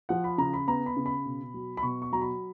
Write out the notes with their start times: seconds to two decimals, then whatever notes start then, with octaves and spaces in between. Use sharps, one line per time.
0.09 F3 F#5
0.24 B5
0.38 C#3 A#5
0.53 B5
0.67 B3 A#5
0.86 B5
0.97 C#3
1.06 B5
1.26 B2
1.54 F#3
1.77 B5
1.83 B2 C#6
2.02 C#6
2.12 F#3 A#5
2.21 B5